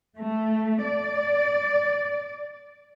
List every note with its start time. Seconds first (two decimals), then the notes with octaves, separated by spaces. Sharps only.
0.17 A3
0.84 D5